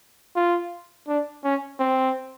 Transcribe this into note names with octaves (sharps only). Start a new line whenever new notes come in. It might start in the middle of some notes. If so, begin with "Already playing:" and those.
F4
D4
C#4
C4